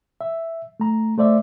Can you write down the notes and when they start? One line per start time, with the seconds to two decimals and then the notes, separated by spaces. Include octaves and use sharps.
0.21 E5
0.80 A3 A#5
1.18 A3 C5 D5 E5